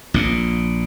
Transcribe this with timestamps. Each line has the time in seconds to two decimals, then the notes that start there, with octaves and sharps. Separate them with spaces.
0.14 A#1 A#2